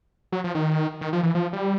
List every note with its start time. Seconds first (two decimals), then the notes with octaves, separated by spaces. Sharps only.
0.32 F#3
0.44 F3
0.55 D#3
1.01 D#3
1.13 F3
1.23 E3
1.35 F3
1.53 G3